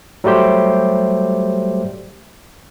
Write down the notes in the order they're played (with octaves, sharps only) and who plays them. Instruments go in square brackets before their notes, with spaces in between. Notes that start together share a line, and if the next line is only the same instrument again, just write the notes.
[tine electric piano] F#3 G3 A3 G4 C5